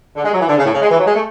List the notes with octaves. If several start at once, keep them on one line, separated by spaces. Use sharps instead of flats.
D3
G#3
F#3
E3
D3
C#3
A2
C#3
G#3
E3
F#3
G#3
A3